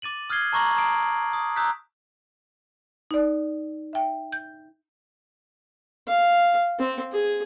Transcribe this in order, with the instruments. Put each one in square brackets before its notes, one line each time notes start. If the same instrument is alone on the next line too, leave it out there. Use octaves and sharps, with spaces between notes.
[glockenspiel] D6 A6 D#7 F#7
D#6 F6 F#6 G#6 C7 G7
A5 A#5 C#6 D6 A#6 F#7
A5 A#5 C#6 D#6 C7 D7
D#6
A#5 D#6 E6 F#6 G6 B6
[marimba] D#4 D5
E5 G5
G6
[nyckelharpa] F5
C4
G#4